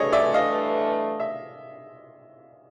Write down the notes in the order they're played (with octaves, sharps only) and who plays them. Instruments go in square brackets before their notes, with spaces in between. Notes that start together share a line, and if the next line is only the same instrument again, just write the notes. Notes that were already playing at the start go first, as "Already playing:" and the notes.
Already playing: [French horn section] G2 E3 A3 D4 [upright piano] G#4 C#5 D#5
[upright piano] D5 E5
D#5 F5
E5